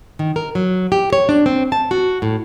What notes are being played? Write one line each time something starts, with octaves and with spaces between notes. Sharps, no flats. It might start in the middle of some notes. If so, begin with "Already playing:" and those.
D#3
A#4
F#3
G4
C#5
D4
C4
A5
F#4
A2